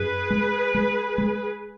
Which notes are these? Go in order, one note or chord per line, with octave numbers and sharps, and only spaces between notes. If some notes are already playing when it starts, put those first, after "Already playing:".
Already playing: F#2 G#4 B4
G#3
G#3
G#3